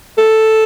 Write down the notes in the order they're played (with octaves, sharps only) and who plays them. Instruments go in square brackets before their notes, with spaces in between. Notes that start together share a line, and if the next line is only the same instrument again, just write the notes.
[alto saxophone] A4